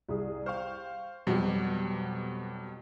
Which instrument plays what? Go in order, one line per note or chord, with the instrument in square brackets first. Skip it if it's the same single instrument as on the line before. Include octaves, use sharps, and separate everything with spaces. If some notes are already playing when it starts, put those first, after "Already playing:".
[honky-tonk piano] C2 G#4
[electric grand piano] C5 F5 [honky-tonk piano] G5 C#6 F6
[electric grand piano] F2 F#3 G3 [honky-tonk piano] B2 F#4 G4